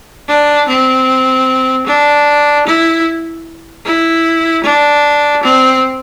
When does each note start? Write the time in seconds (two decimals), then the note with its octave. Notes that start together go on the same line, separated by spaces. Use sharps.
0.29 D4
0.68 C4
1.86 D4
2.67 E4
3.85 E4
4.64 D4
5.43 C4